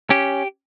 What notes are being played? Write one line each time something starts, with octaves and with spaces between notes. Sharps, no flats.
C#4 G4